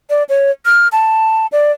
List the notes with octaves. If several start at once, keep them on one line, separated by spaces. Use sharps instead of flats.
D5
C#5
F6
A5
D5